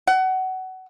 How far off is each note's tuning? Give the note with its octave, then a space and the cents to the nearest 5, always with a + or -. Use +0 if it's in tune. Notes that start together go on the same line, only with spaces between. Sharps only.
F#5 +25